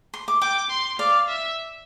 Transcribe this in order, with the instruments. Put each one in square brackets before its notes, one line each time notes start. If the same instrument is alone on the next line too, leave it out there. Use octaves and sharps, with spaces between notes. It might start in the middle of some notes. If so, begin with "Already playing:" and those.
[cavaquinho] C6
D6
[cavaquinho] G5 [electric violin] D6
[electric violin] C6
[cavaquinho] D5 [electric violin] F5
[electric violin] E5